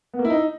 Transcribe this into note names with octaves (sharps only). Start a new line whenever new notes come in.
B3
A#3
E4
D#4